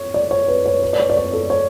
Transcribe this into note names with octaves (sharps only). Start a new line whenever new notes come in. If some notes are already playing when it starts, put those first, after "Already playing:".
Already playing: C#5
D5
C#5
B4
C#5
B4
D5
C#5
D5
C#5
A4
C#5